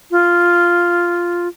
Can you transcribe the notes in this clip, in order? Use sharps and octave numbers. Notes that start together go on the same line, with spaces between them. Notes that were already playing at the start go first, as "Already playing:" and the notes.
F4